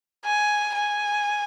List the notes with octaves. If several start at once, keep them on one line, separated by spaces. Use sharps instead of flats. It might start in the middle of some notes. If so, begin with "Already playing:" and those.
G#5
G#5